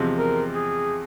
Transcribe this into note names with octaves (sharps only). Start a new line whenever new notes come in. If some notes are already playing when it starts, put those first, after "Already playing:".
Already playing: E2 C3 F3 G#3 C4
A#4
G#4